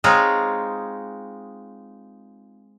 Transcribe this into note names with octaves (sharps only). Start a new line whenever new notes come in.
G#3 C4 D#4 F4 G#4 C#5